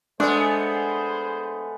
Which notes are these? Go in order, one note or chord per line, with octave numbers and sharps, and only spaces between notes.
G#3 A3 B3 D4 G#4 C5